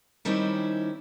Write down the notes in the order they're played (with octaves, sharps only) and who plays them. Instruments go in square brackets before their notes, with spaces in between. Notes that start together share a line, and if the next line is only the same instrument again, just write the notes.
[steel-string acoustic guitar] D#3 G3 C4 C#4 D#4 E4